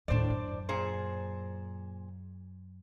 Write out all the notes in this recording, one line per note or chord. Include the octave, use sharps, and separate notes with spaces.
D#2 A2 D4 C5 D5
F#2
A#2 G#4 C5